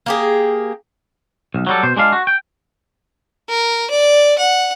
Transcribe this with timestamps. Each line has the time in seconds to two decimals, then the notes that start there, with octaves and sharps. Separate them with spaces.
0.06 A#3 G4 G#4
1.54 B1
1.67 F#3 G3 A4
1.83 B2 C5
1.96 G#3 D4 F4 F5
2.13 F#4
2.27 G5
3.49 A#4
3.91 D5
4.38 F#5